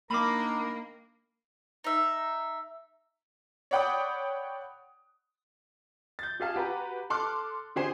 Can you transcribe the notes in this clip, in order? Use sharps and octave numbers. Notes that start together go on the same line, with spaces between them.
D#3 A#3 D4 A#4 B5 D6
D#4 E5
C#5 D5 F#5 G5 B5 D#6
G6 A6
G4 G#4 F5 A5
F#4 G4 B4 A#5
A4 C6 D6 F6 F#6
D3 G4 G#4 C5 G#5 C7